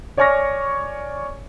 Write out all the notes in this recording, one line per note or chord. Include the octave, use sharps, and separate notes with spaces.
C#5 D5 G#5 C#6 F6 A#6